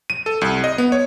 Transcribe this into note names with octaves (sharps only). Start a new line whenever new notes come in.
D#7
A4
C2
D#5
B3
C#5